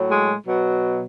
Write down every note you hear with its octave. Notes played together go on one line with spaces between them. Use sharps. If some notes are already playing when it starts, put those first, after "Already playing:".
Already playing: A2 F#3
G#3
B2 F#3